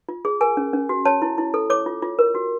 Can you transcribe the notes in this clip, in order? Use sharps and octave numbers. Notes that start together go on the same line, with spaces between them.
F4
G#4
A#4 G#5
C#4
C#4
F#4
C#5 A5
E4
E4
A4
C#5 D6
F4
F4
A#4
F#4